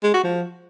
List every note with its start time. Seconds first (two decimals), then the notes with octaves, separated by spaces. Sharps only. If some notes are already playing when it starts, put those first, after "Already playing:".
0.04 G#3
0.14 F#4
0.24 F3